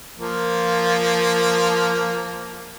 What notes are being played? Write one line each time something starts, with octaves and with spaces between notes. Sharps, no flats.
F3 A#3